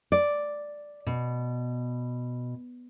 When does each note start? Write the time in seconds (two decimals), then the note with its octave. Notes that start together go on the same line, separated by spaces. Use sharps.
0.12 D5
1.07 B2